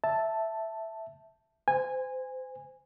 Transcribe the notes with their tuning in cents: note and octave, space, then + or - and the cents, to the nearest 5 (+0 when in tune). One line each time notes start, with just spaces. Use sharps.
E5 +0 A5 +0
C5 -30 G#5 -15